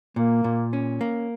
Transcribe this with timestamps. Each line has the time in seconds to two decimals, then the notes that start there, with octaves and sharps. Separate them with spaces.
0.16 A#2 A#3
0.44 A#2
0.73 C#4
1.01 A#3